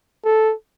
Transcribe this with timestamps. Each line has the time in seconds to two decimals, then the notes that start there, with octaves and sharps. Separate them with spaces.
0.25 A4